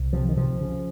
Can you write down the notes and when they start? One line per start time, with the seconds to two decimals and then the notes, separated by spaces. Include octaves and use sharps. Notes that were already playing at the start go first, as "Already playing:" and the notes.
Already playing: C2
0.13 C3 F3
0.29 D#3
0.37 C3 F3
0.61 C#3